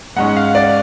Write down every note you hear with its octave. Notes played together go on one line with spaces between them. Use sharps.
G#2 G#3 C#4 F#5
F5
D5